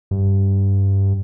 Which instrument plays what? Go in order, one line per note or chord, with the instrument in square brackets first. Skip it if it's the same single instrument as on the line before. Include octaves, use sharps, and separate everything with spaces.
[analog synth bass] G2